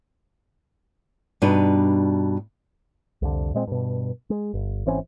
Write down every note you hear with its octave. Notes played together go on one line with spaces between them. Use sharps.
G2 B2 D4 D#4 B4
C2 F2 D3
A#2 G#3 C4
G2 B2
G#3
G1
G#1 E3 C4 C#4